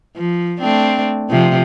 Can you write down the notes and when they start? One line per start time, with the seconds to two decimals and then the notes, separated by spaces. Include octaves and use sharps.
0.16 F3
0.60 A3 C4 D4
1.30 C3 F3